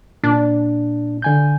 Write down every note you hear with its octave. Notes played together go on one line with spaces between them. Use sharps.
A#2 D4
D3 G#5 G6